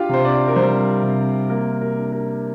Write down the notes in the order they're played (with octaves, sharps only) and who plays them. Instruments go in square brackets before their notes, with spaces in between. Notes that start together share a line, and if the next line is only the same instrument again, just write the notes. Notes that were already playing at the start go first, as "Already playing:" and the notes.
Already playing: [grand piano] D4 F4 G4 F5 G5
C3 C5
D4 D5
A#4
G3 C4 C5
C3
A#3 A#4
A#4
D4
A#4